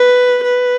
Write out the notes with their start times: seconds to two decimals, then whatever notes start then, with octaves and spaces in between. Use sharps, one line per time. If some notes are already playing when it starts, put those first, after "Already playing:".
Already playing: B4
0.44 B4